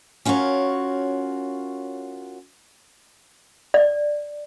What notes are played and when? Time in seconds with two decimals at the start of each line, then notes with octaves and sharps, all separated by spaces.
0.25 C#4 F4 F#4 A#4 C#5
3.74 D5